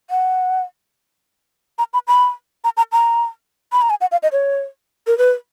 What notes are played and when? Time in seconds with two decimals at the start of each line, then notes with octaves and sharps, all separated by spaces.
0.10 F#5
1.79 A#5
1.94 B5
2.08 B5
2.64 A#5
2.77 A#5
2.92 A#5
3.73 B5
3.82 A#5
3.90 G#5
4.01 F#5
4.12 F5
4.23 D#5
4.32 C#5
5.07 A#4
5.18 B4